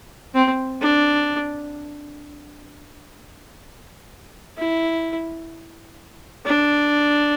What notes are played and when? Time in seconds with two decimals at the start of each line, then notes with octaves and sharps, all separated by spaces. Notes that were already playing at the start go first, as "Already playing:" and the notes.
0.34 C4
0.81 D4
4.57 E4
6.46 D4